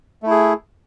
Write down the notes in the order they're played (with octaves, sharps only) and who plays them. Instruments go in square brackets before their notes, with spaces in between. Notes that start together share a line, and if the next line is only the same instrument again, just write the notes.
[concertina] A3
E4
G#4